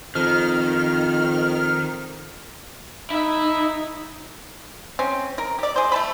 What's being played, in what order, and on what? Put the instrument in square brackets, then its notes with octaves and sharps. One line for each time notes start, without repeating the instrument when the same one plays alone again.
[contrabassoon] F2 [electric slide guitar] D#3 [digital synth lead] F6
[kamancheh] D#4 [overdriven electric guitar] E4 E5
[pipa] C4 C#4
A#4
G4 D5
G#4 C5
A3 A5 B5